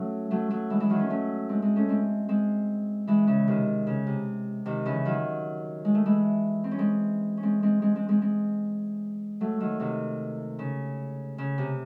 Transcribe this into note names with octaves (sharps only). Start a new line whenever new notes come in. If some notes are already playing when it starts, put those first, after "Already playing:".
Already playing: F#3 A3 C#4
F#3 A3
F#3 A3
E3 G#3
E3 G#3
D#3 F#3
A3 C#4
A3 C#4
G#3 C4
G#3 C4
A3 C#4
G#3 C4
G#3 C4
E3 G#3
C#3 E3
C3 D#3
C#3
C3
C3 D#3
C#3 E3
D#3 F#3
G#3
A3
E3 G#3
C4
C#4
G#3 C4
C#4
G#3 C4
G#3 C4
G#3 C4
G#3 C4
G#3 C4
G#3 C4
F#3 A3
D#3 F#3
C3 D#3
C#3
C#3
C3